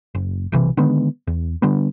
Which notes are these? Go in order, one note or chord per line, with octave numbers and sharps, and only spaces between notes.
F#1
B1 C3 E3
D3 D#3 G#3 B3
E2
D3 G3 B3